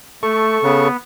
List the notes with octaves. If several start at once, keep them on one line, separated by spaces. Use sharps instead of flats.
A3 A4 C#6
C#3 B3